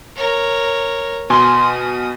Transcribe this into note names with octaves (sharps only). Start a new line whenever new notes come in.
A#4 C#5
B2 G#5 C6 D#6